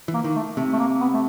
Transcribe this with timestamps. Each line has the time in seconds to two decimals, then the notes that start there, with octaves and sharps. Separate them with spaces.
0.08 E3
0.14 A#3
0.24 D#3
0.36 A3
0.57 C3 A3
0.73 A3
0.79 A#3
1.00 B3
1.13 A3